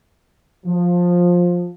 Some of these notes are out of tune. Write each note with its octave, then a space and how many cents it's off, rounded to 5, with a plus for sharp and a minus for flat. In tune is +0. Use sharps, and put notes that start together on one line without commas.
F3 +15